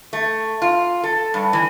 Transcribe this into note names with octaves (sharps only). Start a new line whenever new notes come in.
A3
F4
A4
G2
E3